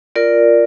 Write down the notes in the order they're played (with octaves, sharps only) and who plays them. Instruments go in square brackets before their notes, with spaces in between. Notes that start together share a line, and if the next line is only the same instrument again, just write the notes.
[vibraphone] F4 A#4 D5